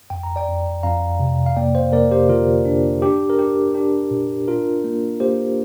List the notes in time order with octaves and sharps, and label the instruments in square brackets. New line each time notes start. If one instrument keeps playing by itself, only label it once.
[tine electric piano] F2 G5
A#5
D5 G5
F2
F2 F5 A#5
C3
F5
A#3 D5 G5
C5 F5
A#3 A#4 D5
G4 C5
D3 F4 A#4
D4
D4 G4
A#4
D4 G4
D4 G4
A#2
D4 F4 A#4
A#3
A#3 G4 C5